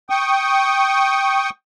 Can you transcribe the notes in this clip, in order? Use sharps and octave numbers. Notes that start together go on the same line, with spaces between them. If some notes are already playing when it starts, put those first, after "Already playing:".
G5 C#6 D#6